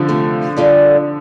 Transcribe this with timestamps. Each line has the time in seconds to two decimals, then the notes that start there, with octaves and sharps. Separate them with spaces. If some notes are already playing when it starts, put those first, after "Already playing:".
Already playing: D3 F3
0.09 C3 A3 F4
0.56 D3 G3 F4 A4 D5